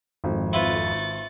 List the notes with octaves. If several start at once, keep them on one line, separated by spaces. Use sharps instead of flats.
G#1 F2
E4 F4 B4 C#6 A6